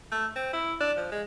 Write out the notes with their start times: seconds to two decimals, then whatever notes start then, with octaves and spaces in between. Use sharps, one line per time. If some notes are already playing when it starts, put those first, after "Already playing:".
0.12 A3
0.36 C4
0.53 E4
0.80 D4
0.97 F3
1.12 G#3